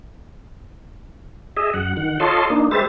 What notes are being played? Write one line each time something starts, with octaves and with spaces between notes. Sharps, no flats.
G#4 D#5 E5
F#2 F#5
D#3 F#5
F4 A4 C#5 D#5 A5 C6
A#3 D4 D#4
G#3 G4 B4 C5 E5 A6